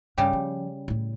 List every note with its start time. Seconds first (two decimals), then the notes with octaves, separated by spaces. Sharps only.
0.18 G2 C#3 G3 G4
0.33 F3
0.88 A2 E4